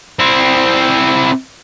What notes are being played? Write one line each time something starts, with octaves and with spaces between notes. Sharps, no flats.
C4 E4